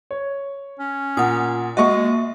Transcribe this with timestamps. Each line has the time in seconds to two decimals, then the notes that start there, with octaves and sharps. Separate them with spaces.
0.11 C#5
0.79 C#4
1.17 A#2 F#5 D#6
1.77 G#3 A#3 F#4 D#5 E5 C#6